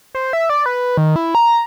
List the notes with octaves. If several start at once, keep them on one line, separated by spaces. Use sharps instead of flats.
C5
E5
D5
B4
D#3
E4
A#5